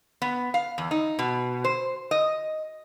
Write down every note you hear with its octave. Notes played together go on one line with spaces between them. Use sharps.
B3
F5
E2
D#4
B2
C5
D#5